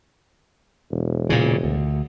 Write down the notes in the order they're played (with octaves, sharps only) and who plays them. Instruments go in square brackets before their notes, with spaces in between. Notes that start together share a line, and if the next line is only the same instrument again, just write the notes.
[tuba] E1
[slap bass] A#2 C#3
D2